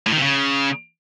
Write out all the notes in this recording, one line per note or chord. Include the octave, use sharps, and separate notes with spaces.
A2
D#3
C3
C#3